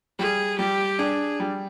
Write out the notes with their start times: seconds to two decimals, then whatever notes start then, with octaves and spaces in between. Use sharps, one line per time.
0.19 G3 G#4
0.59 G3 G4
0.99 D4 G#4
1.40 G3